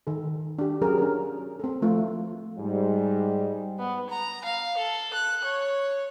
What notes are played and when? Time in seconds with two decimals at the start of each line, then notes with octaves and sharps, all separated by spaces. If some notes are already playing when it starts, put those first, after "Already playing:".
0.07 D#3 A4
0.59 D4 G4
0.81 F#3 C#4 G#4 A#4
0.98 D4 A#4
1.60 C4 A4
1.82 F3 A3 F4
2.58 G#2 G3
3.79 B3
4.09 A#5
4.45 F5
4.77 A4
5.13 F#6
5.45 C#5